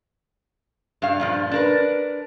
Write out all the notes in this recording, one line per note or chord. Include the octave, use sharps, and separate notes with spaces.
G2 F5
G2 A#2 F3
D4 A#4 B4